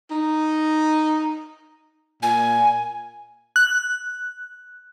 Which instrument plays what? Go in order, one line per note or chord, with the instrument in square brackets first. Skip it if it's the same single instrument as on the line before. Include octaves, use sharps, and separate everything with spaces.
[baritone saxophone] D#4
[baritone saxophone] A#2 [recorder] G#5
[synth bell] F#6